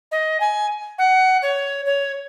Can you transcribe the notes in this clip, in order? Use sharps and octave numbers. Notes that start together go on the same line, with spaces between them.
D#5
G#5
F#5
C#5
C#5